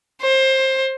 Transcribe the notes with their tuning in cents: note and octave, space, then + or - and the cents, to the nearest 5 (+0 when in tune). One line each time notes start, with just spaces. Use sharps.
C5 +20